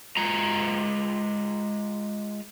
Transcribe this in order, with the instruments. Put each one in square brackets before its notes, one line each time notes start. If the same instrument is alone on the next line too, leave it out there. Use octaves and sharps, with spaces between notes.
[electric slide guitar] G#3 F4 A#5